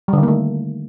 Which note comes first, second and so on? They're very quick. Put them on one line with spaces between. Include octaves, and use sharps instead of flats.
G3 D3 D#3 A#3 A3